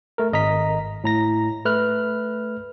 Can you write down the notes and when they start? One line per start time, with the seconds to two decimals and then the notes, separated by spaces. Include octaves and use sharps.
0.18 A3 A#4
0.33 G#1 D#5 A#5 B6
1.04 A2 A#5 A#6
1.65 A3 B4 F6 F#6